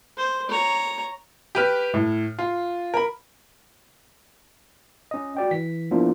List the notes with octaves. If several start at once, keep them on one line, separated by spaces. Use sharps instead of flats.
C5
C#5 A#5
G4 B4 F6
A2
F4
A#4 B5
C#4 D#5
F#4 D5 G5
E3 B6
F3 A#3 B3 D4 E4 F4